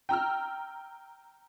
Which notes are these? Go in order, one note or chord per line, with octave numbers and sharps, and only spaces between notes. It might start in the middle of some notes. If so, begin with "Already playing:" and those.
G5 A#5 E6 F6